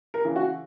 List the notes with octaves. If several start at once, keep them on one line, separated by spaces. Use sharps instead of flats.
A#4
C#3 E3
F#4